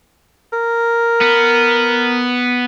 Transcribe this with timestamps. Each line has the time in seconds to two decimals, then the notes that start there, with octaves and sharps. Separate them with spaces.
0.53 A#4
1.21 B3